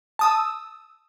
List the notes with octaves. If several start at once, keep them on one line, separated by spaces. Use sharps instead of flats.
A5 D#6 E6